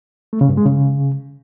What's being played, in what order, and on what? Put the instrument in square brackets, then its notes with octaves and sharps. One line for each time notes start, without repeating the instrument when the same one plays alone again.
[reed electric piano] A3
C#3
G2
G#3
C#3